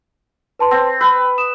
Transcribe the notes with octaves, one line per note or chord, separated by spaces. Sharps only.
B4 A5 C6
C4
B4 E6
D#6 E7